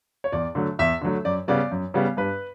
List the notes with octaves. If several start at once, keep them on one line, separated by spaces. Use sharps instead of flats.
C#5
E2 D5
D3 F#3 A3
E2 E5
D3 F#3 A3
F#2 D5
C#3 G3 B3 D5
F#2
C#3 G3 B3
G2 B4